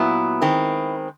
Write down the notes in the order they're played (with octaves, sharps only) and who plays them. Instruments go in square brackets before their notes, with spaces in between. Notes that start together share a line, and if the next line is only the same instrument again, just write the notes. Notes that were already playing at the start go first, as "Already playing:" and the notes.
Already playing: [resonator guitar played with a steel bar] A#2 F#3 B3 E4
D#3 G#3 C4